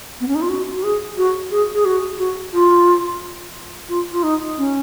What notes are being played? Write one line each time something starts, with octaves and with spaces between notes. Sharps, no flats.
B3
C#4
D#4
F4
F#4
F#4
G#4
F#4
G#4
G#4
F#4
F#4
F4
F4
F4
D#4
C#4